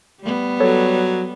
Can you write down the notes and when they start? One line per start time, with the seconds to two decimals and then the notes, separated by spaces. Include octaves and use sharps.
0.21 G3 B3
0.60 F#3 A4 C#5